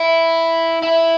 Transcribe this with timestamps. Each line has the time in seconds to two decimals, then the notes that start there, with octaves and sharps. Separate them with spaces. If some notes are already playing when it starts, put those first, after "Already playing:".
Already playing: E4
0.82 E4